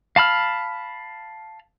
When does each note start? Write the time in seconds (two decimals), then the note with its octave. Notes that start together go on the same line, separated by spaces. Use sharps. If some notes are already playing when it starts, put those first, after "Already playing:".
0.16 F5 A5 B5 F6